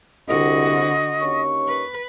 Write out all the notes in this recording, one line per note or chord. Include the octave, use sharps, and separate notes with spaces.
C2 D3 F#4 D#5
D#2 C#4 C#6
B4